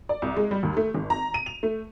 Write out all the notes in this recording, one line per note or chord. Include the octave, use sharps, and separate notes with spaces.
D5
C2
G#3
G3
D#2
A3
G#1
A#5
D#7
F7
A3